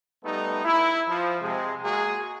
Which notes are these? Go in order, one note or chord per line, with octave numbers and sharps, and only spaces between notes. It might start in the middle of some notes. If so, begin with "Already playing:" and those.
G3 A3 B3 D#4
E4
F3
C3 G#3
G#3 A#3 F#4 G#4